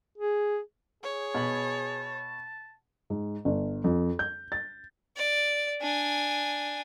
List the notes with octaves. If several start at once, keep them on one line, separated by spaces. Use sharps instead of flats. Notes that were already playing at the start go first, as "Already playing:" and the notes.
G#4
G#4 C#5
B2 A5 B5
G#2
G1
F2
G6
A6
D5
D4 G#5